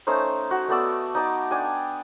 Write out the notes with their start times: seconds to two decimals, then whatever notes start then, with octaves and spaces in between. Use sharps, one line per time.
0.07 A3 C#4 D#4 C5
0.51 F#4
0.68 A3 B3 D5 E6
1.15 D#4 D5 A5
1.51 D4 G5 G#5